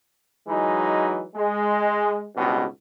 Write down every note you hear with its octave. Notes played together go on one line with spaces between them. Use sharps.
E3 F#3 G#3 D#4
G#3
G#1 C#2 G2 B2